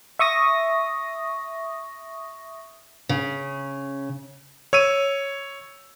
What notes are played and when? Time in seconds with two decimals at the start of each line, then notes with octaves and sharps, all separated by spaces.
0.19 E5 C#6 D#6 A#6
3.09 C#3
4.73 C#5 E6 D#7